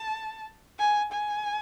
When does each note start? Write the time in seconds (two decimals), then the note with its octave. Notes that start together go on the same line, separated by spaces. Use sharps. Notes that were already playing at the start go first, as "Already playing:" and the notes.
Already playing: A5
0.79 G#5
1.12 G#5